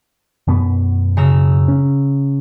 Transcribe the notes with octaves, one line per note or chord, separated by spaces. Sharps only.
F#2 B2 B3
C#3 A#5 E6
C#4